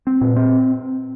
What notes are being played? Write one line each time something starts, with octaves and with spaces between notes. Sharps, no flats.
C4
A#2
C4